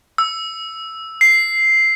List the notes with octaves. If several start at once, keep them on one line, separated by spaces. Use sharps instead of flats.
E6
C7